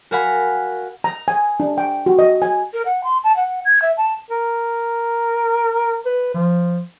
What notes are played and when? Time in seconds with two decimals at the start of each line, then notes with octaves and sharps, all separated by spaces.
0.11 F#4 A#4 F5 F#5 G#5 B5
1.04 A#5
1.28 G#5
1.60 D4
1.78 G5
2.06 F#4
2.19 D#5
2.42 G#5
2.73 A#4
2.85 F#5
3.04 C6
3.24 A5
3.36 F#5
3.65 G#6
3.82 E5
3.97 A5
4.31 A#4
6.06 B4
6.34 F3